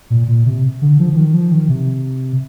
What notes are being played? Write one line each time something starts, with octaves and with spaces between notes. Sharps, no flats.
A#2
A#2
C3
D3
F3
F3
D#3
F3
D#3
C3